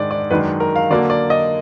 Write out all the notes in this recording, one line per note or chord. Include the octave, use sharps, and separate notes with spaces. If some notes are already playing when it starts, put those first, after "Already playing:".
Already playing: G#2 D#3 G#3 D4 D5
D5
F#2 D#3 G#3 D4 B4
A#4
F5
D3 F#3 A#3 D5
D5
D#5